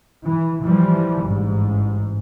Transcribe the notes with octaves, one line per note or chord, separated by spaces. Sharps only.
E3
E3 F3 G3
A1 G#2